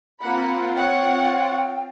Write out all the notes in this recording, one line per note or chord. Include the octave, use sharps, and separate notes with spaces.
A#3 C4 F4 F#5 B5
C#5 F#5 G5